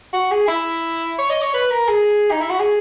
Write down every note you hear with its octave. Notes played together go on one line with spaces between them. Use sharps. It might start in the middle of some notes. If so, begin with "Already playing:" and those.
F#4
G#4
E4
C#5
D#5
C#5
B4
A#4
G#4
D#4
E4
F#4
G#4